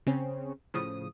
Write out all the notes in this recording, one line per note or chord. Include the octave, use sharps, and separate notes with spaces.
C#3 C4 C#4
A2 C#3 F3 D#6